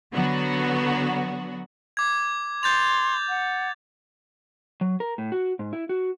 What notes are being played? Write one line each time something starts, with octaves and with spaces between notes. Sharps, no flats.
D3 F#3 B3 F#4
D6 G#6
C6 G6 A6 F7
F#5
F#3
A#4
A2
F#4
G#2
E4
F#4